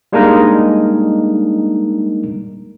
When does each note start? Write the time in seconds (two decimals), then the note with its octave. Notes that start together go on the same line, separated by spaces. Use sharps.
0.13 G3 G#3 A#3 D4 D#4 A#4